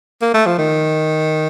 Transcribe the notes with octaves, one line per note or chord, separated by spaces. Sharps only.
A#3
A3
F3
D#3